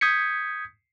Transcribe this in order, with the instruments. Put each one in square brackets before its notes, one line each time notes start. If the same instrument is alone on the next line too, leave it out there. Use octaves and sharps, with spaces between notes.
[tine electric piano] D#6 G6 G#6 B6 C#7